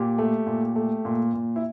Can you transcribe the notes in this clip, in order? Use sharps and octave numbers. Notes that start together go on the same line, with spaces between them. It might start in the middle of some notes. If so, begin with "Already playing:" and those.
Already playing: A#2 G4
A3
A#2
A3
A#2
A#2
E4